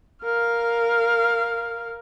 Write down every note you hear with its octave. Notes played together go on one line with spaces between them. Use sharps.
A#4 F5